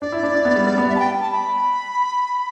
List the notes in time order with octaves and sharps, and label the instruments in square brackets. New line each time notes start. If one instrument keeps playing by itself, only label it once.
[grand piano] D4 [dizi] D5
[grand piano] E4
D4
D4
B3
G3
G3
B3
[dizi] E5
A5
G5
A5
B5